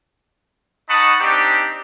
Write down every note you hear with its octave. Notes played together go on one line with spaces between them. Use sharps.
D#4 F#5 A5 B5 C#6 D#6
C4 D4 D#4 G4